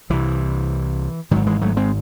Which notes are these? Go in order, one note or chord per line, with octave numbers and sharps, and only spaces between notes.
C2 C3 E3
G#1 G#2 D#3 F#3
E3 G#3
F#3 A3
G#3 C4